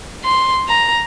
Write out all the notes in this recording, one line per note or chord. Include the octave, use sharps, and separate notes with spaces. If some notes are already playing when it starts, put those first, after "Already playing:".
C6
A#5